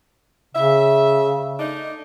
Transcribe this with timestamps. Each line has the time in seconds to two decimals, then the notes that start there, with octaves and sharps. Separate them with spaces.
0.55 C#3 E5
1.60 A3 D4 D#4